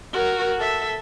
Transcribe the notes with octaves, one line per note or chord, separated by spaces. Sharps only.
F#4 A#4
A4 E5